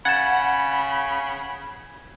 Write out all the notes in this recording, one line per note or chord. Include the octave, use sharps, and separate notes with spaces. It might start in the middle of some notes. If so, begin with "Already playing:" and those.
C#3 F#5 B5 G#6 A6 E7